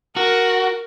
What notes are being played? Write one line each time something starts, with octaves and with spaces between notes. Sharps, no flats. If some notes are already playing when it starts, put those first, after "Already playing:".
F#4 A#4